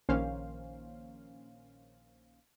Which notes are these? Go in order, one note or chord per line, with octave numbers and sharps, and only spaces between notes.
A#1 D#3 A#3 C#4 C5 F5